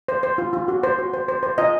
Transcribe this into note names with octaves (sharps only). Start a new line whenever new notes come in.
C5
C5
F4
F4
F#4
C5
F#4
C5
C5
C5
F4 D#5